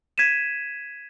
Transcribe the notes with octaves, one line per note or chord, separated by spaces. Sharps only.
G#6 B6 D#7 E7